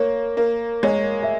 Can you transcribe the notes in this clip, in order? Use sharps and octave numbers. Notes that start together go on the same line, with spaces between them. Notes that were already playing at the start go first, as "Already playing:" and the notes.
Already playing: A#3 C#5
A#3
G#3 C#5
E5